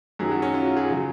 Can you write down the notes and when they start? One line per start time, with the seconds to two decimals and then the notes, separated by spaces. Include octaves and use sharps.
0.19 F#2 D#3 F#3 G#4
0.31 F#4
0.42 C#4
0.54 F4
0.65 F#4
0.77 G#4
0.89 C#3 F#3 G#4